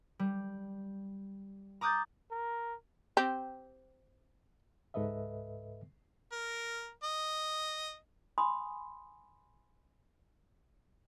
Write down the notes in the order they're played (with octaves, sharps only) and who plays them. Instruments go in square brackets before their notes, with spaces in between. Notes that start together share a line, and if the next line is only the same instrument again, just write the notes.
[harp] G3
A#5 D6 D#6 F#6 G6 A6
[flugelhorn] A#4
[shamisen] C4 G4
[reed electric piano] C#2 G#2 A4 B4 D#5 E5
[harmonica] A#4
D#5
[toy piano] G#5 B5 C6 D#6